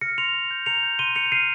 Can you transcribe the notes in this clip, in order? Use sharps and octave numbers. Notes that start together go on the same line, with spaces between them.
F6 A#6 C#7
C6 C#7 F7
C6
G6
A#5 C#7 F7
G6
C6 D#7 G7
G6 C#7 F7
F6 C7 D#7